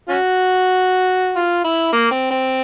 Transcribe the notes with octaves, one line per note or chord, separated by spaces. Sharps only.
C#4 F#4
F4
E4
A#3
C4
C4